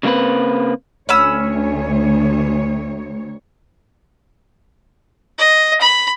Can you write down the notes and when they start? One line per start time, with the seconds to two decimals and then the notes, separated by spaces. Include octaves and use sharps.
0.03 C#3 G3 A#3 C4 B4
1.09 D2 C#4 C#5 B5 E6
5.39 D#5
5.81 B5